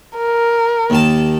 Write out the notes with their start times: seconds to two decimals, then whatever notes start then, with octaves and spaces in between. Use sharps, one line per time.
0.17 A#4
0.90 D#2 D#3 A5